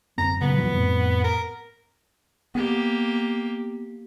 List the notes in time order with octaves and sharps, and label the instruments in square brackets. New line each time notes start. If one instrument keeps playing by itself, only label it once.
[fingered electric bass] D1 F#2 C4 [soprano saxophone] A#5
[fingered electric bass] A#2 C#3 F#3 [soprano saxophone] B3
[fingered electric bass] D#2 A#2 F3
F2 A2 C4
[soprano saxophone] A#4
[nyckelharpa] A#3 G4 [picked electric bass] B3